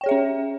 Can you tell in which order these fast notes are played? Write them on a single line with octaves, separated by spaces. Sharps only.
G5 C#5 G#4 E5 C#4